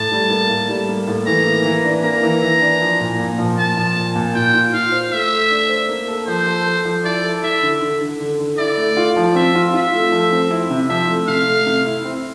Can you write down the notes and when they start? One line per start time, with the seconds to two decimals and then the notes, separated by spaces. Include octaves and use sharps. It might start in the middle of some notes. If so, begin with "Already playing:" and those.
Already playing: A2 A5
0.12 G3
0.30 A#3
0.50 A2
0.69 G3
0.89 A#3
1.07 A2
1.26 E3 A#5
1.46 A#3
1.65 E3
1.84 D4
2.03 A#3 A#5
2.23 E3
2.42 E3
2.62 D4
2.81 F3
3.00 A#2
3.19 A#2
3.39 F3
3.57 A#2 A5
3.77 F3
3.96 A#2
4.15 A#2
4.34 F4 G5
4.54 F4
4.73 F4 F5
4.92 C5
5.12 A3 E5
5.31 A3
5.50 D4
5.69 C5
5.89 A#3
6.08 A4
6.27 F3 C5
6.46 A4
6.66 A4
6.85 F3
7.04 E4 D5
7.24 A4
7.43 E4 E5
7.62 D3
7.81 D3
8.01 D3
8.20 D3
8.39 D3
8.58 E4 D5
8.77 A3
8.97 F4
9.16 F3
9.35 C4 E5
9.55 F4
9.74 F4 E5
9.93 A3
10.12 F3
10.32 C4
10.51 E4
10.70 C3
10.89 F3 E5
11.09 A3
11.27 C3 F5
11.47 A3
11.66 C3
11.86 E4
12.05 C4